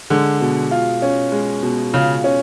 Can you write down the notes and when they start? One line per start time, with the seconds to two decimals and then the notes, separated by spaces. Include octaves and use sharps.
0.10 D3 G#3
0.41 B2
0.71 F4
1.02 C#4
1.32 G#3
1.63 B2
1.94 C#3 F4
2.24 C#4